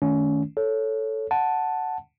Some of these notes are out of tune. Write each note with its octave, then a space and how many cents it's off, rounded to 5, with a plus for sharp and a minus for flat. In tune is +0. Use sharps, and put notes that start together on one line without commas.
D#3 +0 A3 -20 C#4 +25
A4 +0 C#5 +0
F#5 +0 A5 +0